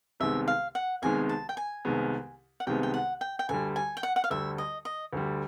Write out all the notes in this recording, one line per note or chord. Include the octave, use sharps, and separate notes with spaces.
C2 C3 D#3 G#3 B3 E5
F5
F#5
C2 C3 D#3 G#3 B3 G#5
A5
G5
G#5
C2 C3 D#3 G#3 B3
F#5
C2 C3 D#3 G#3 B3 G5
G5
F#5
G5
G5
D2 D3 G3 G#5
G#5
G5
F#5
F#5
F5
D2 D3 G3 E5
D#5
D#5
D2 D3 G3